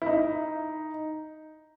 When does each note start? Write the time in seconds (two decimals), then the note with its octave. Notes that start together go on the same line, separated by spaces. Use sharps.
0.02 E4
0.06 D#4